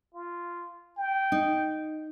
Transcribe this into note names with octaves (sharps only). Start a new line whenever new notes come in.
F4
G5
D#4